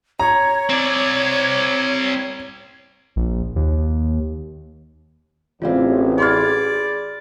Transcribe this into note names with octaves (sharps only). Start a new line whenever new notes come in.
C#5 A#5
C4 D5
A#1
D#2
A1 C#3 C4 F4 D5 F5
G#4 D5 B5 C6 F6 G#6